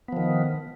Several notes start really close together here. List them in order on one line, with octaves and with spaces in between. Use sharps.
B3 F3 D#3